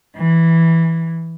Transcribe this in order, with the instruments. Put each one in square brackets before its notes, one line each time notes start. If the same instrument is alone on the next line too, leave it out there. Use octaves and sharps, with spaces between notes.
[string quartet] E3